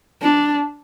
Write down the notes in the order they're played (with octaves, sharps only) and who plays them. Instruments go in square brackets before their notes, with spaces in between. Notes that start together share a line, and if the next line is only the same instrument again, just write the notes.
[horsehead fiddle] D4